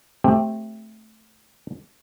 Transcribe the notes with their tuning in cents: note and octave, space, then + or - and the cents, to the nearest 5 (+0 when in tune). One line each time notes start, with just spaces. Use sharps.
A3 +0 C4 +5 G4 +10